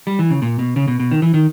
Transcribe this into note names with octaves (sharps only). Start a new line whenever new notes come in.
G3
E3
C#3
A#2
B2
C#3
B2
B2
D#3
E3
D#3